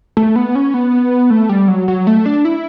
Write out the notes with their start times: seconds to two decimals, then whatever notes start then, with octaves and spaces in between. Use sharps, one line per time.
0.17 A3
0.36 B3
0.55 C#4
0.74 B3
1.30 A3
1.49 G3
1.68 F#3
1.88 F#3
2.07 A3
2.26 D4
2.45 E4